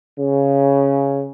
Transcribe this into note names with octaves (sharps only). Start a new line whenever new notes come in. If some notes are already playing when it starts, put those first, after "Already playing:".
C#3